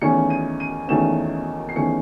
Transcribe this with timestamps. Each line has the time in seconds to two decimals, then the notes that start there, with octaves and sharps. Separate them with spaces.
0.02 E2 D#3 A3 C#4 C#7
0.30 D#7
0.60 D#7
0.88 E2 D#3 A3 C#4 E7
1.69 C7
1.75 E2 D#3 A3 C#4 C#7